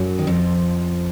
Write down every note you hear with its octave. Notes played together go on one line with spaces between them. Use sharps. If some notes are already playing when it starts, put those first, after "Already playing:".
Already playing: F#2 F#3
D#3
F2 F3